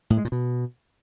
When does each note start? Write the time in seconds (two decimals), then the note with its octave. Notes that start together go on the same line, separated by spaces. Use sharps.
0.10 A2
0.17 G#3
0.25 A#2
0.32 B2